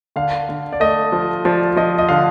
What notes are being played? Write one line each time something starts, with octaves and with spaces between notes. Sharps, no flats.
D3 F5
D3
D5
A3 D#5
F3
F3 D5
F3 D#5
D#5
D3 F5